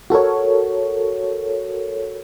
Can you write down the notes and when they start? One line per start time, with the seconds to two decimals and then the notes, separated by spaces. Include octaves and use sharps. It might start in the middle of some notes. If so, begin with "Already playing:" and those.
0.10 F#4 A4 A#4 C#5